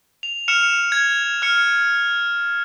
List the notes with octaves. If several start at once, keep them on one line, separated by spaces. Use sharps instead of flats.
F7
F6 C#7 E7 F7
G#6
F6 C#7